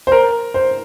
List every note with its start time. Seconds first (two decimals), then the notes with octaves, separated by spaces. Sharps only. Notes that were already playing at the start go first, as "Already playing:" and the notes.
0.07 C5
0.12 A#4
0.54 C5